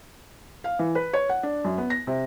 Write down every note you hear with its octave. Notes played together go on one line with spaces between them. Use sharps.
F5
E3
B4
C#5
F#5
D4
F#2
B3
A#6
C3